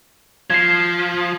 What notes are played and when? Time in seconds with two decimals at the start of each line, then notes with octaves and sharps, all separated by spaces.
0.50 F3 G#6 C7